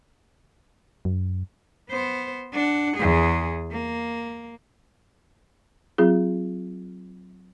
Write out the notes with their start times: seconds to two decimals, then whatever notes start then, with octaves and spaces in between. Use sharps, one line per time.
1.05 F#2
1.90 B3 C5
2.53 D4 F#5
2.96 E2 G#4
3.72 A#3
5.98 F#3 C4 F4 G#4